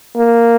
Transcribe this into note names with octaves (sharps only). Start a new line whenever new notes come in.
A#3